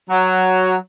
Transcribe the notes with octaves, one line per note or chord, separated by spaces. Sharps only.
F#3